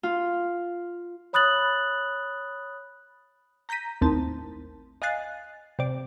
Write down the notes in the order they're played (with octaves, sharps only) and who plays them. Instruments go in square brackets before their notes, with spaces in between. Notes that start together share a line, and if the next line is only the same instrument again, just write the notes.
[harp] F4
[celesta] C#5 B5 D#6 F#6 A6 F#7
[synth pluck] A#5 G6 A#6 B6 D#7
A1 D#2 C4 A5
D#5 F5 G#5 F#6 A6 C7
C3 D5